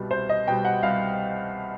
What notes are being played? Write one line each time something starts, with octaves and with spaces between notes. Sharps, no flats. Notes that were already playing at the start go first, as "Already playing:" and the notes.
Already playing: C2 B2 G3
C2 C5
D#5
B2 G3 G5
F#5
C2 F5